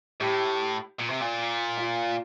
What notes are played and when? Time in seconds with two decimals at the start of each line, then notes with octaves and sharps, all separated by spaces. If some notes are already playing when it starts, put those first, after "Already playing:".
0.21 A2 G4
0.99 A#2
1.10 C3
1.21 A#2
1.78 F4